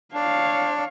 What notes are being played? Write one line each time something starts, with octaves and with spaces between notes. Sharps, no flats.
D4 C#5 F5